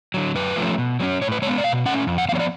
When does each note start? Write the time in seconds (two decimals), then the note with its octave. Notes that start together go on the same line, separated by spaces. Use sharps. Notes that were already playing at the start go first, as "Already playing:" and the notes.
0.14 D3 F#3
0.35 F#2 B4
0.56 F3 A3 C#4
0.78 B2
1.00 F#3 A3 C#4
1.22 A2 C#5
1.32 B4
1.42 G#3 C#5
1.47 B3
1.58 D5
1.64 B2 F5
1.86 A3 C#4 F#5
2.07 F2
2.18 F#5
2.28 F3 F5
2.32 B3 C#5
2.40 D5